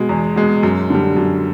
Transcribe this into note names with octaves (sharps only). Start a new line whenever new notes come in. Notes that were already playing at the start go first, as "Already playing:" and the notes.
Already playing: B2 G#3
E2
B2 G#3
F#2
D3 G3
F#2